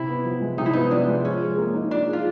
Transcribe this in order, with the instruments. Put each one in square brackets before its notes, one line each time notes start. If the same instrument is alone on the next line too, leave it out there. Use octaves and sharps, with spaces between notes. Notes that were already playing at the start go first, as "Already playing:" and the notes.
Already playing: [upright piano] C3 [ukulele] E4
[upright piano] B3
F3
G#3
[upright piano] C3 [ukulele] D#4
[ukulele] E4
[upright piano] B3 [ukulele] D#4
[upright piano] F3 [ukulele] D4
[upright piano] G#3
[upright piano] F3 [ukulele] C#4
[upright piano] G#4
A#3
D#4
[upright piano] F3 [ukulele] D4
[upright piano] G#4
[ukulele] F4